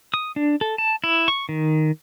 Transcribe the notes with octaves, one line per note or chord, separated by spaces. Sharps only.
D#6
D4
A4
A5
E4
C#6
D#3